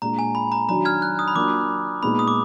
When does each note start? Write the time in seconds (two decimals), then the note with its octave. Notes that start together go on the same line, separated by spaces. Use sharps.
0.02 A#2 G#3 D4 A#5
0.19 G#5
0.35 B5
0.52 A#5
0.68 D#3 F#3 D4 F#4 A#5
0.85 F6 G#6
1.02 F#6
1.19 D#6
1.28 B5
1.36 F#3 A#3 D4 F4 D6
2.02 A#2 G#3 B3 D#4 B5
2.19 D#6
2.28 D6